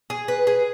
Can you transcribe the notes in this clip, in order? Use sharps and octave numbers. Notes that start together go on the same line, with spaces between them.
G#4
B4
G#4